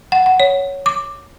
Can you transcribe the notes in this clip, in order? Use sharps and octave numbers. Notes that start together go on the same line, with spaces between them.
F#5
F#5
C#5
D6